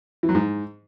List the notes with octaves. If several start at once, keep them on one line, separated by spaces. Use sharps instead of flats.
E3
F#3
G#2